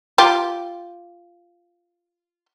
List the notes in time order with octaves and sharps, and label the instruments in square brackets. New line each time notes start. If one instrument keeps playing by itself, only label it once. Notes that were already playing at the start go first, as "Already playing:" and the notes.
[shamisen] F4 G4